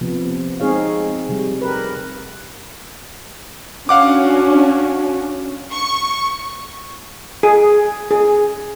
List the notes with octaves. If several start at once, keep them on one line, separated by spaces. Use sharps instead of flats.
C3 F3 B3
G#3 C4 D#4 G#4 C#5 F5
C3 G3
G4 A#4 B4
C#4 D4 F#4 F5 F#5 D6
C#6
G#4
G#4